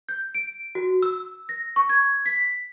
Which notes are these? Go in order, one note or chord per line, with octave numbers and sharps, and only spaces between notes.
G6
D7
F#4
E6
A#6
C#6
G#6
B6